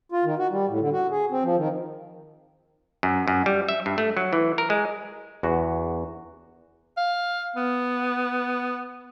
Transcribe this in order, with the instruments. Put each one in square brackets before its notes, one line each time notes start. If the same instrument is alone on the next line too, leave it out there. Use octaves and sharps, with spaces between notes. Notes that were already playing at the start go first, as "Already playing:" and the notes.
[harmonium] F4
D#3
F#4
G3
A2
D3
F#4
G#4
C4
F3
D#3
[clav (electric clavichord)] F#2
F#2
G3
E5
G2
A3
F#3
E3
A#4
G#3
E2 F#4
[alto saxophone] F5
B3